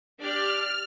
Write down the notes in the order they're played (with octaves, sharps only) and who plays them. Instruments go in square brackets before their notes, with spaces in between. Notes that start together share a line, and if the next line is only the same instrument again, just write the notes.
[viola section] D4 G4 D5 [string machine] F6